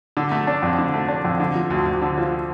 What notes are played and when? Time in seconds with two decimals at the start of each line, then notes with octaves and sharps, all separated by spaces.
0.17 D3
0.31 A3
0.47 D4
0.62 F2
0.78 D3
0.94 A3
1.08 D4
1.25 F2
1.40 D3
1.55 F3
1.70 D2
1.86 D2
2.02 D3
2.18 F3